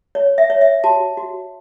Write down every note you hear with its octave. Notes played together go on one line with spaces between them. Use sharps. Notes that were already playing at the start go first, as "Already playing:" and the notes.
C#5
E5
C#5
E5
F#4 A5
F#4